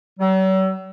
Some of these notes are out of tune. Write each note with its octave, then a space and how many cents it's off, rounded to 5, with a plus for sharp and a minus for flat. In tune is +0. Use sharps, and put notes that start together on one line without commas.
F#3 +45